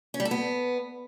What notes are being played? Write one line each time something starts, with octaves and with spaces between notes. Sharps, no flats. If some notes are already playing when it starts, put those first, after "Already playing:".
C#4
G3
A4
B3